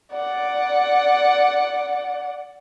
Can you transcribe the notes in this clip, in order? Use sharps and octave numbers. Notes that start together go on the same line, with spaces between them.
D5 F#5